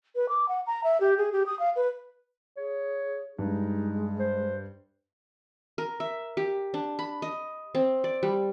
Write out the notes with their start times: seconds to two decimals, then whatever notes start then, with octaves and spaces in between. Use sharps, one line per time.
0.16 B4
0.29 D6
0.49 F#5
0.67 A#5
0.84 E5
1.01 G4
1.18 G#4
1.32 G4
1.46 D#6
1.59 F5
1.76 B4
2.57 G#4 C#5
3.39 G2 G#3 D#4
4.20 C5
5.78 A#4
6.00 E5
6.37 G4
6.74 D4
6.99 B5
7.22 D#5
7.75 C4
8.04 D5
8.23 G3